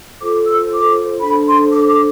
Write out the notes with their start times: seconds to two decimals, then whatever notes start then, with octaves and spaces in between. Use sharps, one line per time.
0.21 F4 A4 C5 D6
0.46 E6
0.71 D6
1.21 D4 A4 C5 B5
1.46 C6
1.71 D6
1.88 D6